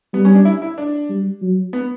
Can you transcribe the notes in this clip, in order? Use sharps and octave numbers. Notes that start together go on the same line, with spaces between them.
G3 B3
C#4
D4
E4
E4
D4
G3
F#3
B3